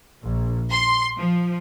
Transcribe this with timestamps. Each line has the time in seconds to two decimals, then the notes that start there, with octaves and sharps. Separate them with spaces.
0.21 A#1
0.71 C6
1.18 F3